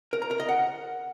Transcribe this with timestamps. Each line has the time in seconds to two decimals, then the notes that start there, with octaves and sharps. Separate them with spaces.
0.13 A#4
0.22 A#5
0.31 A#4
0.40 D#5
0.49 F#5